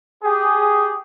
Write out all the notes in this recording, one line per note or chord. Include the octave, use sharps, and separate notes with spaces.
G4 G#4